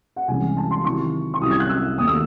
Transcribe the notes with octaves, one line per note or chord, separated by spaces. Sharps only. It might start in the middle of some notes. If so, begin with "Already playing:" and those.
F#5
C2 C3 E3 G#3 C#4 G#5
A5
C6
C3 D#3 F#3 C4 E4 C#6
C#6
C2 C3 F#3 C#4 E4 D#6
G#6
F#6
E6
D#2 D#3 A3 D#6
E6